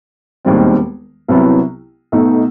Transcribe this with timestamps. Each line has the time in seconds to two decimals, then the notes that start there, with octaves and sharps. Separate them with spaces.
0.45 E1 D#2 D#3 G3 C4
1.28 C2 C3 F#3 B3 E4
2.12 B1 B2 A3 D#4